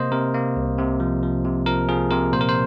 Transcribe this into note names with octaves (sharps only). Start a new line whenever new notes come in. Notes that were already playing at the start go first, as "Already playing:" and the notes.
Already playing: C3 A#3 C5 D#5
C3 A#4
A#3
C2
C3
F3
F3
C3
F3 A#4
F3 G#4
C3 A#4
A#2 C5
A#4
C5